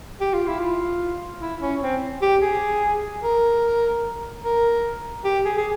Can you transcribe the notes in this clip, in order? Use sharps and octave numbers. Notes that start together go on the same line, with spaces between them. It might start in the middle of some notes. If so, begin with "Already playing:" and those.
G4
F4
E4
F4
E4
C#4
C4
G4
G#4
A#4
A#4
G4
G#4
G#4